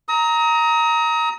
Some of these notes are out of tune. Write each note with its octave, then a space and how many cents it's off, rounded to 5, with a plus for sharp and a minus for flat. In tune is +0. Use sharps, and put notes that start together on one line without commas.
A#5 +0 D#6 +35